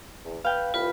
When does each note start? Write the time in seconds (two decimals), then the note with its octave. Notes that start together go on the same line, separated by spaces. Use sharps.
0.25 E2
0.44 B4 F5 G5
0.74 C2 F4 B4 B5